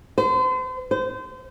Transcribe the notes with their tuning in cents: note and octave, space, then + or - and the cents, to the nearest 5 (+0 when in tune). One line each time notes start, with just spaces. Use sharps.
C5 -40
C5 -30